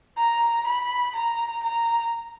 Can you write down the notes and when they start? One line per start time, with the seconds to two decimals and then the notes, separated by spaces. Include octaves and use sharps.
0.18 A#5
0.67 B5
1.15 A#5
1.63 A#5